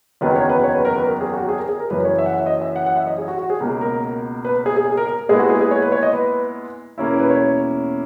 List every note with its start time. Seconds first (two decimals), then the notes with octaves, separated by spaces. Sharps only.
0.21 F#1 E2 D#3 F#3 B4
0.36 C#5
0.49 B4
0.64 C#5
0.75 B4
0.85 A#4
0.95 B4
1.06 A#4
1.21 G#4
1.34 F#4
1.49 G#4
1.59 A#4
1.69 G#4
1.80 A#4
1.90 F#1 F#2 E3 B4
2.05 C#5
2.19 E5
2.26 F#5
2.34 E5
2.46 D#5
2.61 E5
2.76 F#5
2.86 F#5
2.97 E5
3.07 D#5
3.18 G#4
3.28 F#4
3.38 F#4
3.50 G#4
3.60 C#2 B2 A#3
3.81 A#4
4.45 B4
4.66 G#4
4.76 G#4
4.87 G#4
4.97 A#4
5.08 A#4
5.29 A#2 G#3 B3 E4 G#4
5.39 F#4
5.50 G#4
5.61 G#4
5.71 C#5
5.82 B4
5.92 C#5
6.03 D#5
6.13 B4
6.98 E2 B2 A#3 C#4 E4
7.09 A#4
7.19 B4
7.30 C#5